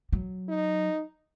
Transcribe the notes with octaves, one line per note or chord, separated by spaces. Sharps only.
F#3
D#4